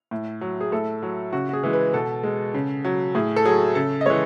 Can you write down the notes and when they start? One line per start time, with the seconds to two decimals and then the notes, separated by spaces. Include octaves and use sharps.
0.11 A2
0.41 F#3
0.61 G#4
0.72 A2 A4
1.03 F#3
1.33 C#3 F#4
1.49 F#4
1.53 G#4
1.63 E3 G#3
1.73 B4
1.94 B2 A4
2.23 G#3
2.54 C#3
2.85 F#3
3.15 A2 G#4
3.36 A4
3.45 F#3 G#4
3.75 C#3 A4
4.01 D#5
4.06 E3 G#3 C#5